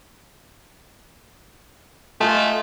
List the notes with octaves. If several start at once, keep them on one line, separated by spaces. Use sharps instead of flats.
A3 F4 D#5 G#5